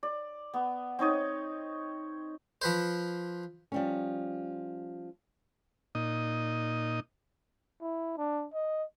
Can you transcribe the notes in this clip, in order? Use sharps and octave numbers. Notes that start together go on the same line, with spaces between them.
D5
B3
C4 D#4 C#5 D#6
F3 B4 C5
F3 G3 C#4
A#2 D#4 D#5
E4
D4
D#5